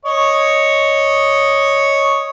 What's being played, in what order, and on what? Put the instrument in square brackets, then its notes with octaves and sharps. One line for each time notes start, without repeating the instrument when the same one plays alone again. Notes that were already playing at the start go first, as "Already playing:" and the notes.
[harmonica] C#5 D#5